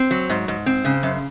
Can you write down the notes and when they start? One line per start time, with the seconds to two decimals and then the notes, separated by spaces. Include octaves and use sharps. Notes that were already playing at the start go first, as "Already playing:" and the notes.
Already playing: C4
0.11 F#3
0.30 G#2
0.48 G#2
0.66 C4
0.85 C#3
1.03 F#2